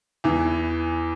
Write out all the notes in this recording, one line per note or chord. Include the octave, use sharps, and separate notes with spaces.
E2 E3